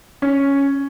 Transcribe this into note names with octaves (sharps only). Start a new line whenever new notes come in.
C#4